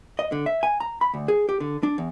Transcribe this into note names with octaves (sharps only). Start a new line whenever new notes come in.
D#5
D3
E5
G#5
A#5
B5
D2
G#4
G4
D3
D4
E2